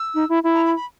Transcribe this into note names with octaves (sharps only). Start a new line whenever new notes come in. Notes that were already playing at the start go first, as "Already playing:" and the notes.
Already playing: E6
D#4
E4
E4
A#5
B5
B5